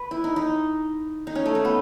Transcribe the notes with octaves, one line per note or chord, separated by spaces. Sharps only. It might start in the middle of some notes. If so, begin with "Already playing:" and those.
Already playing: B4
E4
D#4
D#4
D#4
C#4
A3
D#4
B3